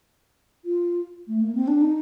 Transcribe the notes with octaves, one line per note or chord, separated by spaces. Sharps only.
F4
A3
A#3
C4
D4
D#4